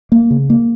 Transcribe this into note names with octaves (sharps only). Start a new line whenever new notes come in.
A#3
C#3
A#3